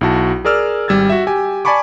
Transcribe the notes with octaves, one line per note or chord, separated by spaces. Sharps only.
B1 E4 F#4 A5
G#4 A#4 D5 E6 F6
G#1 G3 E6 G#6 A6
F#4 E5
G4 G#5
D5 G#5 A5 B5 C#6 D6